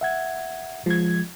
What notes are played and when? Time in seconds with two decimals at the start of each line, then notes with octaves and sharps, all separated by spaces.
0.01 E5 F#5 G#6
0.86 F3 G#3 G#6